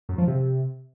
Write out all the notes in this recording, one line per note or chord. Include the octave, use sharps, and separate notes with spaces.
F#2
F3
C3